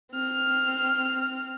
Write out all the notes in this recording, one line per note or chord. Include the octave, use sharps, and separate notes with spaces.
C4 F6